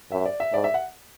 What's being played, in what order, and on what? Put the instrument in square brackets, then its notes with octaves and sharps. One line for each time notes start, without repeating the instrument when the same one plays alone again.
[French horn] F#2 [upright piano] E5
[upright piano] D5
E5
[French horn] G#2 [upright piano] D5
[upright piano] E5
F#5